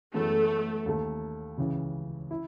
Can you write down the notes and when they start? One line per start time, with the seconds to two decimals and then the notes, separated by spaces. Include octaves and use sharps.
0.14 F#2 E3 G#3 A3 B3
0.86 D#2 D#3 A3
1.58 C#2 C#3 E3
2.31 E4